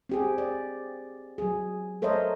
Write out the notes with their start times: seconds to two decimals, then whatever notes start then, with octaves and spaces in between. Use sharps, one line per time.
0.09 C4 G4 G#4
0.38 D5
1.38 F#3 G#4
2.02 A4 A#4 C5 C#5 D#5 E5